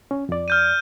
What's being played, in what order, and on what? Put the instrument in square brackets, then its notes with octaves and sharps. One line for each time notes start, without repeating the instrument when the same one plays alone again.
[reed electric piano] C#4
F2 D5
[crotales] F6 G6 D#7